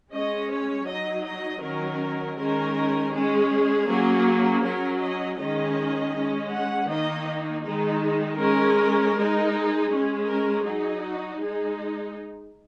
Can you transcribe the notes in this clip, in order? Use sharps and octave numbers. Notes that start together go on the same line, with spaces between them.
G#3 C#4 D#5
C#5
F#3 D#4 D#5
D#5
D#3 F#3 C#4 A#4
D#3 G#3 C#4 A#4
G#3 C#4 G#4
F#3 A#3 C#4
F#3 C#4 A#4
D#5
D#3 G#3 C#4 D#5
G#3 C#4
F#5
D#3 A#3 D#4 D#5
D#3 G#3 D#4
G#3 C#4 A#4
G#3 D#4
G#4
G#3 C#4
A#4
F#3 D#4 G#4
F#4
G#3 D#4 G#4